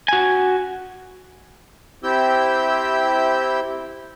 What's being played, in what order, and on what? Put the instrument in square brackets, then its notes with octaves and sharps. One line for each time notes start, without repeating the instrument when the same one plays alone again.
[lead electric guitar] F#4 G#5
[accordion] C4 E4 G4 E6 G6